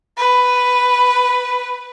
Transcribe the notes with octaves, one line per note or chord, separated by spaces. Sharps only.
B4